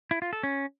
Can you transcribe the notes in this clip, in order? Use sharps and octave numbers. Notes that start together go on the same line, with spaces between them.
E4
F4
A4
C#4